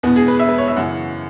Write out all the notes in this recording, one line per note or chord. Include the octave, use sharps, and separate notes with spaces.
E2 B2 B3
G#4
B4
E5
B4
C#5
E5
F#2 C#3 E3 F#5